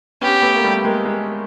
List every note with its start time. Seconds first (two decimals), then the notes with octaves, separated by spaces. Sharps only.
0.22 B3 C#4 G4
0.42 A3 B3
0.56 A#3
0.64 G3 A3
0.85 G#3 A#3
1.05 G#3 A#3